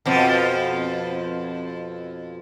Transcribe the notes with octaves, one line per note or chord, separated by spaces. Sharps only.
F2 B2 F3